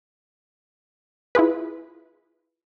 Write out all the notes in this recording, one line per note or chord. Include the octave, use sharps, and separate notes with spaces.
E4 F4 G#4 B4